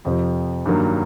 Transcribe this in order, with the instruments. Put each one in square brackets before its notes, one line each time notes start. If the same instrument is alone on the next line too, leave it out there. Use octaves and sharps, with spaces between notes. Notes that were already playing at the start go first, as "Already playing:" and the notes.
[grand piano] F2 C3 F3
G2 D#3 F#3 A#3